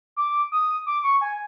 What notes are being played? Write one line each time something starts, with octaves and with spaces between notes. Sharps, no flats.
D6
D#6
D6
C#6
G#5